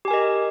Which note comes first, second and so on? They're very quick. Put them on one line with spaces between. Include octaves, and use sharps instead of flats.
G4 G#5 A#4 D#5